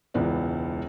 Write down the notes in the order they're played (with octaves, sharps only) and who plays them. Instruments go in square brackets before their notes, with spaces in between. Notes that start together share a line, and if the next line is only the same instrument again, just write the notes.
[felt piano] E1 C#2 E3 B3 D5